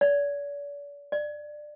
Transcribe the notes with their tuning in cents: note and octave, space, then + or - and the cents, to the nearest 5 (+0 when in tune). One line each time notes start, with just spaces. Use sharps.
D5 -40
D5 +20